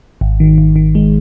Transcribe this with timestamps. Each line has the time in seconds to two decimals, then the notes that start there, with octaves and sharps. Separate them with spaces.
0.21 G#1
0.40 D#3
0.58 G#1
0.76 D#3
0.95 G#3